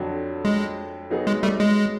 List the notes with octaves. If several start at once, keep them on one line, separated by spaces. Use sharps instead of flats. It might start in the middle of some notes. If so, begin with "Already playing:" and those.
Already playing: F2 D3 F#3
G#3
F#3 B3 D#4 G#4
G#3
G3 A3
G#3